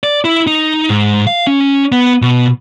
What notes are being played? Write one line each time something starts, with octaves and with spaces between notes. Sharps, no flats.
D5
E4
D#4
G#2
F5
C#4
B3
B2